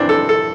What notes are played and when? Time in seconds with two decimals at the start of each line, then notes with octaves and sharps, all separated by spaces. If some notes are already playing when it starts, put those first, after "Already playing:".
Already playing: E2 E3 C4 D4
0.09 A4
0.29 A4